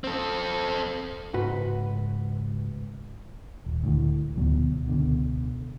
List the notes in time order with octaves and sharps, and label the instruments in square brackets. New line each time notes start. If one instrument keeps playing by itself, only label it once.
[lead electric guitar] C4 A4
[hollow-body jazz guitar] C#2 G#2 F#4 B4
[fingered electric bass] D#1
D2 A2
D2 B2 F#3
C#2 B2 D3